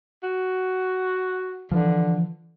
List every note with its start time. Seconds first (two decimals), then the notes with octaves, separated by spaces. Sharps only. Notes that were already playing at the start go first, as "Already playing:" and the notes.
0.23 F#4
1.71 D3 E3 F3